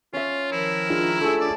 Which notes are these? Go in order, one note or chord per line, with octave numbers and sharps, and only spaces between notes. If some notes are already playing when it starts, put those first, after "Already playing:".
C#4 F4 E5
D#3 F3 E4 A#4
G#3 D4 F4
A3 G#4 A4 E6
D5